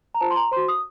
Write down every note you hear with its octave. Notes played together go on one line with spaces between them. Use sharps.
A#5
F4 C5 A5
C6
A#5
F#4 C5 C6
D#6